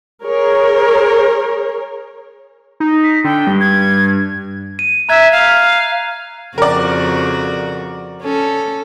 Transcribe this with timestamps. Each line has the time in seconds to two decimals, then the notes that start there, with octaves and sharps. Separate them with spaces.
0.25 G#4 A#4 C#5
2.80 D#4
3.04 B6
3.24 D3 G5
3.47 G2
3.61 G#6
4.79 D#7
5.09 E5 A#5 F#6 G#6
5.31 F5
6.58 F2 C#3 F#4 A#4 D5
8.22 C#4 A4